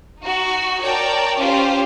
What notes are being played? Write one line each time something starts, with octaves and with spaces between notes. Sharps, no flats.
D#4 F#4
A#4 C#5 D5 G5 A5 A#5
C#4 F4 G4 C5